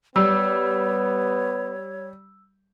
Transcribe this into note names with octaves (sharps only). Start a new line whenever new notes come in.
G3 B3 C#5 E6